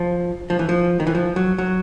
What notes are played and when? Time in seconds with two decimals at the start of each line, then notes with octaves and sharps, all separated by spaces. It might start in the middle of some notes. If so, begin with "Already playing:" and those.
Already playing: F3
0.50 F3
0.59 E3
0.69 F3
1.00 D#3
1.07 E3
1.15 F3
1.36 F#3
1.58 F#3